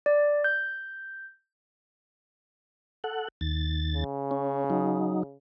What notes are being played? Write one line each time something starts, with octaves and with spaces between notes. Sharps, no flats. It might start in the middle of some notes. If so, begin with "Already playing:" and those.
D5
G6
A4 F#5
D#2 A6
C#3
C#4
F#3 D#4